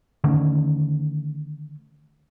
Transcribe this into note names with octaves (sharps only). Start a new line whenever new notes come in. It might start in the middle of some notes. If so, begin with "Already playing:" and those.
D3 D#3 A3 C#4